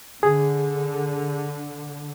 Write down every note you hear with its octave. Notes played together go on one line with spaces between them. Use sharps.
D3 G#4